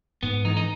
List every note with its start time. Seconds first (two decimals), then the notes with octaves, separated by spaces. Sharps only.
0.23 G#2 B3
0.45 E3 D#4
0.57 D#4